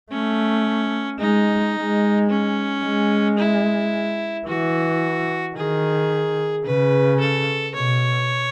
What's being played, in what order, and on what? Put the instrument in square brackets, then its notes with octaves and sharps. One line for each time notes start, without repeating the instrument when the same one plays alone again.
[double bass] A3 [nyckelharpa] C#4
[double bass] G#3 [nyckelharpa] D#4
[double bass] G#3
[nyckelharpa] C#4
[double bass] G#3
[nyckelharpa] E4
[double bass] E3 [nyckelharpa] F#4
[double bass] D#3 [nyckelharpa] G#4
[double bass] C#3 [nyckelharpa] B4
[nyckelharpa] A4
[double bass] B2 [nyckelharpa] C#5